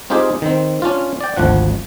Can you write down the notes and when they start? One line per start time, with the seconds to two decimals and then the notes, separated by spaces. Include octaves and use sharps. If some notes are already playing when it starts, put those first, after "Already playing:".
0.10 C4 D#4 F4 G4 G#4
0.42 D#3 C4
0.82 C#4 D4 F4
1.21 D5 G5
1.37 G#1 D2 F3 F#5